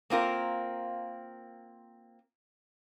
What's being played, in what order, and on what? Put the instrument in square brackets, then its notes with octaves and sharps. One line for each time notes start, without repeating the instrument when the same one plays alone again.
[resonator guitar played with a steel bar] A#3 C4 F4 A#4